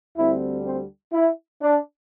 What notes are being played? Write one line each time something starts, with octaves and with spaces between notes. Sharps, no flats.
D2 D3 G3 C4 E4
C4
E4
D4